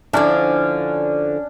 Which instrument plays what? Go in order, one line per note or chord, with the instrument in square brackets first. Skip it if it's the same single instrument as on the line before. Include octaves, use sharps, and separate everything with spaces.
[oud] D3 F3 E4 [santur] C#4 D4